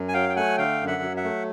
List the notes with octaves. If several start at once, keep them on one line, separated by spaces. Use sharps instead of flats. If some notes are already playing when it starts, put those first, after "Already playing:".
Already playing: F#2
G#5
F#3 F5 G5
G5
A3 F#5 G#5
D3 F5 G5
F#2
E5 F#5
F#3
E5 F#5
A3